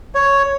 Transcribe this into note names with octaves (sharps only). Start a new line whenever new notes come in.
C#5